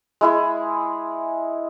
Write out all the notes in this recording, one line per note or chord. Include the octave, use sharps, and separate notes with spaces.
G#3 E4 G#4